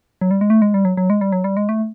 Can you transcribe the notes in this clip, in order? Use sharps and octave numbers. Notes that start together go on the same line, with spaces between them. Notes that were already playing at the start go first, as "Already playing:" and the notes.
F#3
G3
G#3
A3
G#3
G3
F#3
F#3
G#3
G3
F#3
G3
G#3
A3